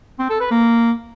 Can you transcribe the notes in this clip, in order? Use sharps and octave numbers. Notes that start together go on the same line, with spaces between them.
C4
A4
B4
A#3